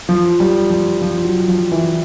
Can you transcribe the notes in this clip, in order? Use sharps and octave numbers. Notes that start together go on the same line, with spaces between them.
F3
G3
F3
F3
F#3
F3
E3